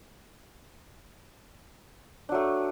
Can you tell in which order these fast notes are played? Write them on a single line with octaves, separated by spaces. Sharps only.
D4 F#3 A3